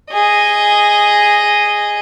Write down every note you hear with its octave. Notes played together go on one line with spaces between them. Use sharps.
G#4 D#5